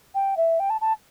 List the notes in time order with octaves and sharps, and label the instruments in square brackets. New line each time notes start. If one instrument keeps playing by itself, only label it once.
[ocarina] G5
E5
G5
A5
A5